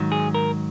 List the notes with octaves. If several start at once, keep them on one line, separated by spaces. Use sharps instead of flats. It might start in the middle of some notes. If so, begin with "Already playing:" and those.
Already playing: G#2 D#3 F#3
G#4
A#4